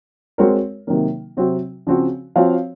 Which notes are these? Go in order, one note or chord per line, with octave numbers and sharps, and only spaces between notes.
G#3 C4 F#4 A#4 C#5
C3 D#3 F#3 A#3
C3 F#3 C4 F#4
C#3 F3 C4 F#4
F3 C4 F#4 C#5 F5